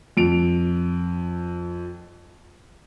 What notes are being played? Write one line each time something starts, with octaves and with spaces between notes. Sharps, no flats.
F2 D7 F7